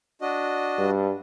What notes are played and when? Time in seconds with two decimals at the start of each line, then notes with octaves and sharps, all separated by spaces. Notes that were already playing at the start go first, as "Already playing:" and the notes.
0.21 D4 F#4 D#5
0.79 G2